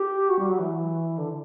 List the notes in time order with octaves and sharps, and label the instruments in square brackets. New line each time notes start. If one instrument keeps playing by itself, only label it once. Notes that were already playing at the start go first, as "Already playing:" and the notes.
Already playing: [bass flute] G4
F#4
G3
F#3
E3
D3